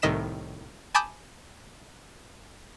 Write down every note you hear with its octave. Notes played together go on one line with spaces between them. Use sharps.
C2 A2 D#3 D#5 B6 E7
G#5 A5 B5 D6 D#6 G6